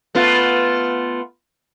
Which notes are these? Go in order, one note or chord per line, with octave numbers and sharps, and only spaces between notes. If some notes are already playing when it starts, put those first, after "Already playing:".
A3 B3 F4